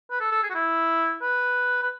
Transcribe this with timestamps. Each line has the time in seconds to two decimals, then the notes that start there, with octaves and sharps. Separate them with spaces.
0.11 B4
0.20 A4
0.32 A4
0.43 G#4
0.50 F#4
0.55 E4
1.22 B4
1.82 B4